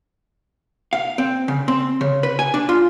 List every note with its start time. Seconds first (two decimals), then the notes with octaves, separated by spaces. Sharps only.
0.93 F5
1.18 C4
1.48 C#3
1.68 C4
2.01 C#3
2.23 B4
2.39 G#5
2.54 D4
2.69 F4